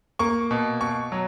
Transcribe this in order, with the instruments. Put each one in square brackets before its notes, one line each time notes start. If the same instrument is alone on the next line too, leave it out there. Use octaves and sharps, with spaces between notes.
[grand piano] A#3 C#6
B2
B2 C#6
F#3